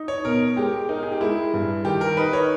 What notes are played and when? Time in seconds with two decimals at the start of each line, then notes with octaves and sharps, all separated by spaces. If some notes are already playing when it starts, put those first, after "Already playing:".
Already playing: D#4
0.08 C#5
0.25 B2 A#4
0.56 G#3 G4
0.89 D#4 A#4
1.03 G#4
1.12 G4
1.20 G#3 E4
1.53 G2
1.85 D#3 G4
2.01 A#4
2.17 D#4 B4
2.33 C#5